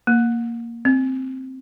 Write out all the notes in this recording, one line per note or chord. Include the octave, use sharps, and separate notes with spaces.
A#3
C4